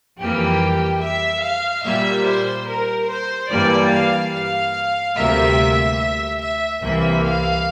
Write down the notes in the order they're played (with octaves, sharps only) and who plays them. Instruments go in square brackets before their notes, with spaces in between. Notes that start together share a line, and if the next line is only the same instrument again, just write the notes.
[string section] F2 E3 G3 A#3 G4
E5
F5
A#2 G3 A#3 E5
C5
A#4
C5
G2 E3 G3 A#3 D5
F5
F5
D2 C3 G3 A#3 E5
E5
E5
C2 C3 E3 A#3 E5
F5